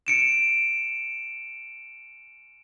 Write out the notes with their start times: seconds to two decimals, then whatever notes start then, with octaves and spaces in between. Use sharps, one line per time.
0.07 C#7 D7 E7